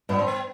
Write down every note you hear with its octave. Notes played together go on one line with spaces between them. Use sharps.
G2 B3
C4
B3